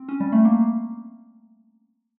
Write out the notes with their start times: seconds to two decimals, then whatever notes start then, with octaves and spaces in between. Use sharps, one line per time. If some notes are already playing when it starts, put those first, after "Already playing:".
Already playing: C4
0.09 C#4
0.20 G3
0.32 A3
0.45 A#3